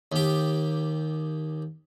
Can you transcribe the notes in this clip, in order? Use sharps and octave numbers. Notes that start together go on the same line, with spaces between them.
D#2 G4